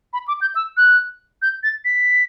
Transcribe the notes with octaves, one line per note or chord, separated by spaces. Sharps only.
B5
D6
G6
E6
F#6
G6
A6
B6